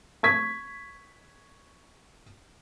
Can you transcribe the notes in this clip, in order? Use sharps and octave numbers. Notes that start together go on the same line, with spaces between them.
C#6 G#6 B6